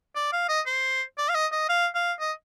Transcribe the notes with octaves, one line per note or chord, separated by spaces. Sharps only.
D5
F5
D#5
C5
D5
F5
D#5
D#5
F5
F5
D#5